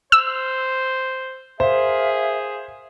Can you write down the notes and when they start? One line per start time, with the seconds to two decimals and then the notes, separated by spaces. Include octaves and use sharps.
0.12 C5 E6
1.60 G#4 A#4 C5 E5 F5